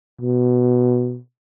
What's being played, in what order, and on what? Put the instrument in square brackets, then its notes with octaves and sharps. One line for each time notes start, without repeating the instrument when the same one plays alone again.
[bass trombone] B2